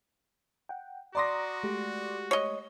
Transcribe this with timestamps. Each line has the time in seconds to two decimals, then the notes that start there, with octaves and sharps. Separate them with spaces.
0.69 F#5 G5
1.15 F#4 D5 A#5 C6 D6 D#6 A#6
1.63 G#3 A3 G4
2.31 C#5 D#5